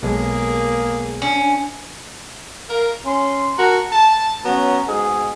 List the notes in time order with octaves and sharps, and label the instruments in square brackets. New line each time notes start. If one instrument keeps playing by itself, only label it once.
[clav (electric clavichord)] B1 G#3 [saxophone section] A#3 G#4
[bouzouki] C#4 [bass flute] D4
[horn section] A#4 F5
C#4 C6
F#4 A#4 A5 A#5
A5
F#3 B3 C#4 A#5
G#2 B2 G#4